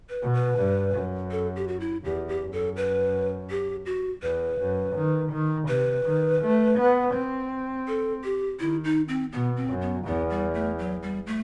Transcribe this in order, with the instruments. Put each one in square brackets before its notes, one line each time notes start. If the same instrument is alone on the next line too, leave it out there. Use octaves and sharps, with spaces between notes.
[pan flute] B4
[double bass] B2
[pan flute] B4
[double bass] G2
F#2
[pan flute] A4
G4
F#4
E4
[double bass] E2 [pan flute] G4
[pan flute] G4
[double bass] F#2
[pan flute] A4
B4
G4
F#4
[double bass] E2 [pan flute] B4
[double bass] F#2
D#3
D#3
[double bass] C3 [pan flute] B4
[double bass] D#3
A3
B3
C4
[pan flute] A4
G4
[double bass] D#3 [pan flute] E4
[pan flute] D#4
C4
[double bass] B2 [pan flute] B3
[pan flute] C4
[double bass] F#2
[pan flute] B3
[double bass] E2 [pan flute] B3
[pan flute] G3
A3
F#3
G3
A3